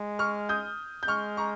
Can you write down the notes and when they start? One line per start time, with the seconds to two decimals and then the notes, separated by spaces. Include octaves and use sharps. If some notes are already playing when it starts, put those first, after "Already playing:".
Already playing: G#3
0.19 C#6 F6
0.49 D#6 G6
1.03 G6
1.08 G#3 C#6 F6
1.37 A#5 C#6